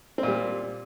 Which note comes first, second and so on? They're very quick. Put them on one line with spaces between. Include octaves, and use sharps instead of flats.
C4 A#2 G3